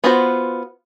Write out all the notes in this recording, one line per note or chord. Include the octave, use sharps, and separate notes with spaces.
B3 F4 F#4 C5